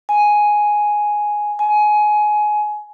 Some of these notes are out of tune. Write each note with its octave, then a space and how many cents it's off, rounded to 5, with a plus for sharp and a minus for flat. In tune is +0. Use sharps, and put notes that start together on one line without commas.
G#5 +5
G#5 +20